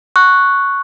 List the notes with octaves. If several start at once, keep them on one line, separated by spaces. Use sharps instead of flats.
C#6 F#6